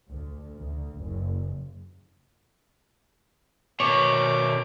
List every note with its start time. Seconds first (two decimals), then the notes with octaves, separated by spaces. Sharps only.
0.11 D2
0.57 D2
0.98 F#1
3.80 B2 D#3 C#5 D6